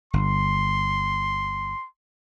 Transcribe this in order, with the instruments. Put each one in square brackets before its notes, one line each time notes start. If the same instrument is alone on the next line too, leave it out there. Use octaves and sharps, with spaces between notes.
[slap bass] G1 [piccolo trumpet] C6